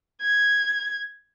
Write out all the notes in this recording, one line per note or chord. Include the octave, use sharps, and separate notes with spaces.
G#6